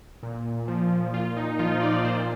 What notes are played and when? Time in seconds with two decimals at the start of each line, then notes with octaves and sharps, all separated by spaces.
0.23 A#2
0.68 F3
1.14 A#2 F4
1.37 D#4
1.59 F3 F4
1.82 D5
2.04 A#2 C5